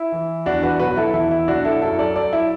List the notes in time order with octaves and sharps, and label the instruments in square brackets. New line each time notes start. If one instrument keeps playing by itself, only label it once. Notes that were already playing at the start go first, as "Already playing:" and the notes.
Already playing: [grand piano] E4
E3
E2 D4 F#4
F#4 B4
B2 F#3 F#4 B4
F#4
E4 A4
E2 E4
E4
B2 F#3 D4 F#4
E4 A4
F#2 E4 A4
A4 D5
F#3 A4 D5
E4